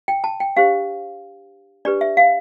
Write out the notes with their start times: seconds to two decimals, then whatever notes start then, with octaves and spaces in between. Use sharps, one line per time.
0.08 G5
0.24 A5
0.40 G5
0.57 D4 G4 C5 F5
1.85 D4 G4 B4 D5
2.01 E5
2.17 F5